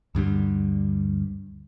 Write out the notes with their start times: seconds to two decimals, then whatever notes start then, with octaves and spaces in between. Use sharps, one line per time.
0.15 D2 G2 D3 G3